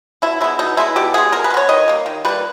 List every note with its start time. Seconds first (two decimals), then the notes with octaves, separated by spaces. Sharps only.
0.22 B2 E4
0.41 G#3 B3 E4
0.59 B2 D#4
0.77 G#3 B3 E4
0.96 B2 G4
1.14 G#3 B3 G#4
1.32 B2 A#4
1.44 B4
1.50 G#3
1.54 B3 C#5
1.69 D#3 D#5
1.88 G3 A#3
2.06 D#3
2.25 G3 A#3 B4